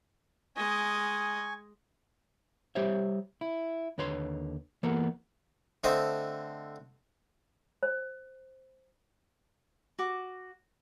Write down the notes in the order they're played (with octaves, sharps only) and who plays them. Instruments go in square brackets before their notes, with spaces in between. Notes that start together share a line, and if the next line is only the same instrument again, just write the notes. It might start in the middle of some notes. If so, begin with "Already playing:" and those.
[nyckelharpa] G#3 D#5 [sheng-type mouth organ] G#5 C#6
[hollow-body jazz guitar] G3 G4 C5 C#5 E5
E4
D#2 D3 B4 C#5 C6
E3 A#3 B3 A4 A#4
[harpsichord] D3 A3 C4 C5 D#5
[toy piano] C5
[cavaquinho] F#4 D6